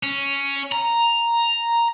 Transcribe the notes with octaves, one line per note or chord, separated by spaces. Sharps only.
C#4
A#5